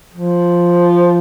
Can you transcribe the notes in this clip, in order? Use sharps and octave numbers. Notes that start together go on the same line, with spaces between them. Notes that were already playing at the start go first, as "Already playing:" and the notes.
F3